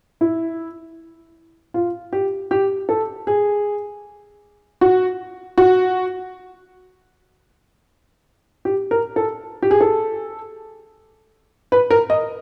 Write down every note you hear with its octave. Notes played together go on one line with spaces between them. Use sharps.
E4
F4
G4
G4
A4
G#4
F#4
F#4
G4
A#4
A4
G4
G#4
A4
B4
A#4
D#5